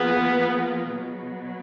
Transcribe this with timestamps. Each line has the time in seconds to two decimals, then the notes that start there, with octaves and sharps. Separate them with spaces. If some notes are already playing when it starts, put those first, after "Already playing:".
Already playing: F3 A#3 B3 F4 G#4 B4
0.87 B2 F#3 B3